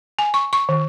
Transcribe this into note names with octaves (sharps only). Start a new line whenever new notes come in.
G#5
C#6
C#6
D#3